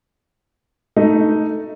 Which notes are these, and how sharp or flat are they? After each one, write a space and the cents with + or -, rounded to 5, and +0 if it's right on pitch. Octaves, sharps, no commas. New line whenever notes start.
A3 +5 D#4 +0